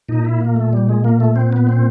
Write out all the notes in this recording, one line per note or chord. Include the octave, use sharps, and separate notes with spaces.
A#2 D#4
E4
A#3
A3
G3
G#3
A#3
A3
C4
B3
C4